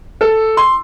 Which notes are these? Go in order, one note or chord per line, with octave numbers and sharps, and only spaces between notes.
A4
C6